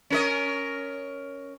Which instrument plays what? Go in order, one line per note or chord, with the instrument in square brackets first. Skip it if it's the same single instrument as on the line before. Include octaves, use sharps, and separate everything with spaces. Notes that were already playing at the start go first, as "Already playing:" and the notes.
[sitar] C#4 A#4 D#5